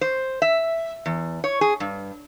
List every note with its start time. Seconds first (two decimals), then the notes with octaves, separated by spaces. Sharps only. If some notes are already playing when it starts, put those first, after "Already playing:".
0.01 C5
0.42 E5
1.06 E2
1.44 C#5
1.61 G#4
1.80 G2